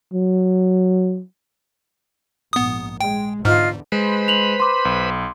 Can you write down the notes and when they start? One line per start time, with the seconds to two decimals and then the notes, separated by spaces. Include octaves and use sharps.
0.14 F#3
2.53 A#1 G#2 B3 D#6
3.00 G#3 G5
3.45 E2 G#2 D3 F4 D#5 F6
3.92 G#3 B4 C5 B5
4.28 F7 F#7
4.60 C6 D6
4.85 B1